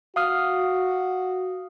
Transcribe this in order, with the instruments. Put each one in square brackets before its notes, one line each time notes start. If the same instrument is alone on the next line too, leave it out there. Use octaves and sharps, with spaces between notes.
[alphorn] F#4 [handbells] F5 D#6 F6